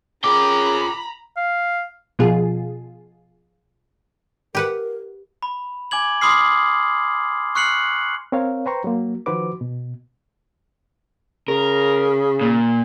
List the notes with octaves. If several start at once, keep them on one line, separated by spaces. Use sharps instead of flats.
C#4 F4 G#4 A#4 G5 A#5 B5 D6
F5
B2 F3 F4 G#4
G4 A#4 B4 F#5
B5
G#5 D6 G#6 F#7
B5 C6 D6 D#6 F6 C7
C#6 F6 F#6 C7 C#7 F#7
C4 A#4 C#5 F5
B4 C5 G5 A#5 C6 C#6
F#3 A#3
D#3 F3 F#4 B4 C5 D6
B2
C#3 A#4
A#2